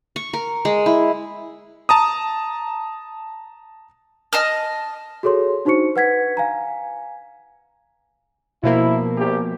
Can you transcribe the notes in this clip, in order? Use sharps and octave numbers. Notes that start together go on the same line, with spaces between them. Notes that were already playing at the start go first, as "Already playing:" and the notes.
C#6
A#4
G#3
E4
A5 A#5 D#6
D#5 A5 F6
F#4 G#4 A4 C#5 C6
D4 D#4 F#4 C5 C#6 C#7
B4 F#5 G#6 B6
F5 G#5 A#5
B2 F3 A#3 E4
A#1 G4